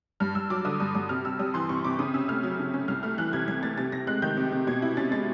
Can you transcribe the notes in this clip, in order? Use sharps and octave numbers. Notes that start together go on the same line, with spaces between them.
G2 F6
G2 E6
F#3 D6
D3 D#6
G2 D#6
G2 D#6
C3 F6
C3 E6
G3 D#6
E3 C6
C3 C#6
C3 D6
C#3 D#6
C#4 E6
A3 F6
F#3
C#3
C#4
C2 F6
A3 F6
E3 F#6
C3 G#6
C2 G#6
A3 A6
C3 A6
C3 A#6
G#3 F#6
D#3 G6
C3
C3
B2 G#6
E4
C#4 A6
G#3 A6